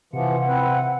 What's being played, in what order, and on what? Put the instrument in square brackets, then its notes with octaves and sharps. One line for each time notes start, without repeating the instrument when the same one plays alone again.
[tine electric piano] C3 [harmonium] E3 F3 [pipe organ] F#5
[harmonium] C4 E4 B4